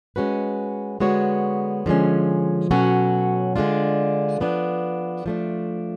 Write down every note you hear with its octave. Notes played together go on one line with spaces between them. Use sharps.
G#3 C#4 F#4 B4
D3 G#3 B3 F#4 C#5
D3 F3 G#3 C#4
B2 F#3 C#4 F#4 A4
D3 G#3 D4 F4
F3 B3 D4
F3 A3 D4